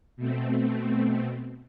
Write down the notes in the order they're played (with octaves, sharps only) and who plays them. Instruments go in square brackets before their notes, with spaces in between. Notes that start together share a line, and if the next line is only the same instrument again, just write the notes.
[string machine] B2 A3 C4